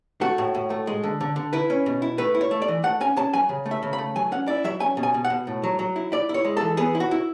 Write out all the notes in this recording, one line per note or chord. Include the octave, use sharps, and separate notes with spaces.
A3 F#4
A2
A2
A3
G#3
D3
D3
D3
E4 B4
C#4
B2
E4
A3 B4
E4
C#5
A3
D5
E3
A3 F#5
C#4 G#5
C#4 A5
F#3 G#5
C#3
A3
E5
C#3
B5
A3
F#3 G#5
C#4 F#5
E4 D5
F#3 E5
C#4 G#5
B2
G#5
B2
F#5
B2
A2
F#3
F#3
E4
E4 D5
E4
C#5
G#3
E3 A4
B3 G#4
E4
F#4
E4